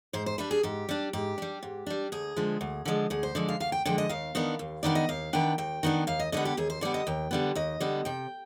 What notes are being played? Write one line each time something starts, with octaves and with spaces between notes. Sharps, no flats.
G#2 C5
C5
G3 D4 B4
G#4
G#2 G4
G3 D4
G#2 G4
G3 D4
G#2
G3 D4
D2 G#4
D3 F3 G#3
D2
D3 F3 G#3
D2 G#4
C5
D3 F3 G#3 D5
F5
D2 F5
G5
D3 F3 G#3 G5
D#5
D#2 F5
D#3 B3 D4
D#2
D#3 B3 D4 D5
D#5
D#2 F5
D#3 B3 D4 G5
D#2 G5
D#3 B3 D4
D#2 F5
D#5
D3 G3 B3 D#5
G4
D#2 G#4
C5
D3 G3 B3 D5
D#5
D#2 G5
D3 G3 B3
D#2 D#5
D3 G3 B3
C3 G5